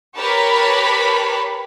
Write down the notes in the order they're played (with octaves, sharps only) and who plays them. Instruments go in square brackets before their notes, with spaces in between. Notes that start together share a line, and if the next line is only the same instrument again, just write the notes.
[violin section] G4 A#4 B4 C#5 A5 B5